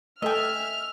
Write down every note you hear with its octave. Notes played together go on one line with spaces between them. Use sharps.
A3 A4 D#5 E5 G5 G#5 F6